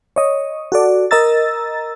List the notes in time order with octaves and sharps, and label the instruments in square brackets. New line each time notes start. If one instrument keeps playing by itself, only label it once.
[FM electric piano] C#5 D#5
F#4 A4 D5
A#4 D#5 A#5 E6 A6